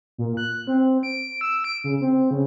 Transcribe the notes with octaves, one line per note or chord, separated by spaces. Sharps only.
A#2
F#6
C4
D7
E6
D7
C#3
C4
C#3